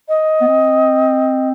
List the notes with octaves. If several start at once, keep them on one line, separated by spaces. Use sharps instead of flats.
D#5
B3
C4